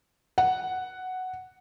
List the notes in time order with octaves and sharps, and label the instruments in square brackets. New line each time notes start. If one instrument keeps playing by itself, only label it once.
[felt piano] F#5